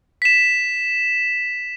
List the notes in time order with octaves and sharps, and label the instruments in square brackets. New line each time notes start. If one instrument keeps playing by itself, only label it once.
[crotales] B6 E7